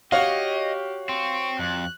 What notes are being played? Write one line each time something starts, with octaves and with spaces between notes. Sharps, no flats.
F#4 G4 C#5 D#5 F5
C4 C#6
F2 F#6